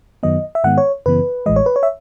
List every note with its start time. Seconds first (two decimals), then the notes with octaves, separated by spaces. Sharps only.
0.23 F#2 D#3 F#3 B3 D#5
0.55 E5
0.64 G#2 D#3 G#3 B3 F#5
0.78 C#5
1.06 F#2 C#3 E3 B3 B4
1.46 A1 A2 E3 G#3 D#5
1.56 C#5
1.66 B4
1.76 C#5
1.83 E5